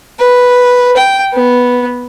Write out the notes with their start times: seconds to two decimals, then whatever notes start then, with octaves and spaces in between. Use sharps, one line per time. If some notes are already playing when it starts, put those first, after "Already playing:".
0.19 B4
0.97 G5
1.33 B3